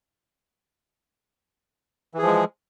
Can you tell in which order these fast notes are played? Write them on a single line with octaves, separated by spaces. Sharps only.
E3 G#4 F3 G#3